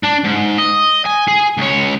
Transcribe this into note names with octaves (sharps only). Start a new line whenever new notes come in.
D4
G#2
D#5
G#5
G#4
C#2 C#5